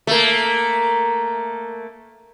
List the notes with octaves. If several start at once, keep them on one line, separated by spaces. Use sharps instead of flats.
A3 A#3